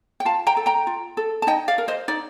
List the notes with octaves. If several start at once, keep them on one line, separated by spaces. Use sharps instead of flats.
G5
F4 F5 A5
G5 A#5
A4
G5 A#5
F4
A4
A5
D#4 D#5 G5
D5 F5
A#4
C5 D#5
D#4 D5